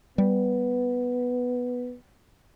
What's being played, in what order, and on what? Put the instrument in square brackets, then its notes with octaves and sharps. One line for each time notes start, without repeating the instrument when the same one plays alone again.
[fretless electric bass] G3 [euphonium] B3